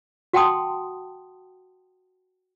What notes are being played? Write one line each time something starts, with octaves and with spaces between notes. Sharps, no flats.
F#4 F#5 G5 A5 C6 D#6